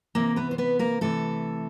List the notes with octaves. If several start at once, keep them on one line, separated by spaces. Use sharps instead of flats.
C3 E3 A#3 A#4
B3 B4
C5
B3 B4
A#3 A#4
C3 E3 A3 A4